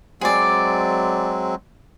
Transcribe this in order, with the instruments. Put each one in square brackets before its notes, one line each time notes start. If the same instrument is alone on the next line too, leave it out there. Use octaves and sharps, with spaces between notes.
[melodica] F#3 G#3 C4 [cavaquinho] G#4 D5